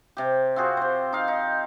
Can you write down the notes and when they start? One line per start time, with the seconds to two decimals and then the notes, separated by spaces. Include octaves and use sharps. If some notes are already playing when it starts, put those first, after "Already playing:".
0.17 C3 G4
0.56 C4 F4 F#4 G#4
0.77 G4 C5
1.13 D#4 F5
1.28 D#4